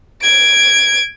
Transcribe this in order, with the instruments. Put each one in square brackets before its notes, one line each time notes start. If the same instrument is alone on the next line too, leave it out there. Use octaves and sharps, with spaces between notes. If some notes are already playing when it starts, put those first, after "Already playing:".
[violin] G#6 D7